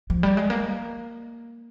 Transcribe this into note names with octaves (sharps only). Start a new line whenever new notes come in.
F3
G3
G#3
A#3